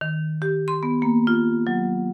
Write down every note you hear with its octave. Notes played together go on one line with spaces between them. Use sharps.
D#3
G4
C6
B3
A#3
F4
F#3